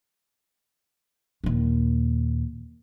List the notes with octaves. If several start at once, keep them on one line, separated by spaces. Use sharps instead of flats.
D#2 A#2